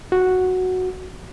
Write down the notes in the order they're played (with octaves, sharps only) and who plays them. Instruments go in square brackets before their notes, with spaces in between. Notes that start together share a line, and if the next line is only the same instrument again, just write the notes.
[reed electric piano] F#4